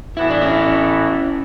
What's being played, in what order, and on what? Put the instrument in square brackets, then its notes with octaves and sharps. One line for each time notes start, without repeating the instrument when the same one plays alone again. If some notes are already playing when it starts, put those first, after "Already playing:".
[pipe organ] A2 E3 B3 F#4 A4 [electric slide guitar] E4
[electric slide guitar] D4
C#4 E4